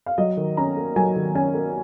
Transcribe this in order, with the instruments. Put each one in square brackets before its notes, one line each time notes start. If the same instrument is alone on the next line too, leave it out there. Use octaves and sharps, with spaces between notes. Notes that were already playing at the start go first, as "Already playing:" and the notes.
[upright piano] F5
F#3 D#5
D#3
C#4 A#5
A#3
F#3 G#5
D#3
C#4 G#5
A#3